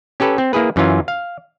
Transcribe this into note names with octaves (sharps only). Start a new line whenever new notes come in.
C#4 G4 A4 B4
C4
A#3 E4 G#4 B4
F#2 E3 C#4 F4
F5